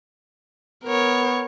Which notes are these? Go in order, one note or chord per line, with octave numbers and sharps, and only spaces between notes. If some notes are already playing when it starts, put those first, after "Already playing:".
B3 A#4 C#5